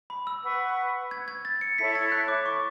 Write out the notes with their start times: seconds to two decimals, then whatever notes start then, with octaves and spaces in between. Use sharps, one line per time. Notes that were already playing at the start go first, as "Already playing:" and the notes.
0.10 B5
0.27 E6
0.44 B4 F#5 C#6
1.11 G#6
1.28 G#6
1.45 A6
1.61 C#7
1.78 E4 A4 C#5 E5 B6
1.95 A6
2.12 F#6
2.28 D6
2.46 C#6